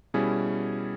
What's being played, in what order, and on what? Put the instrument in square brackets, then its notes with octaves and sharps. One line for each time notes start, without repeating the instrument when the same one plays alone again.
[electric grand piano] B2 G3 C#4 E4 G#4